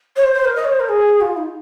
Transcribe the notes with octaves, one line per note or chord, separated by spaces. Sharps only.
C#5
C5
C5
A#4
D#5
C#5
C5
A#4
G#4
F4
D#4